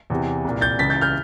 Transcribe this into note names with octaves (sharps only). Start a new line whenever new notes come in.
E2 C3 E3
C2 A#2
G6 A6
C#2 C#3 E3 A6 B6
G6 A6
F6 G6